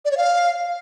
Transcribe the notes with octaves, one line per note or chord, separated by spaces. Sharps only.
D5
C#5
F5